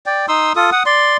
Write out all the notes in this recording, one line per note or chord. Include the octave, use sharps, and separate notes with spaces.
D5 G5
D#4 C6 D#6 E6
F4 A4 D#6
F#5 D#6
D5 C6